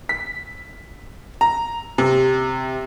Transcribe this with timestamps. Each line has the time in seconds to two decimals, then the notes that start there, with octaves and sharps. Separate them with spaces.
0.09 B6
1.41 A#5
1.98 C3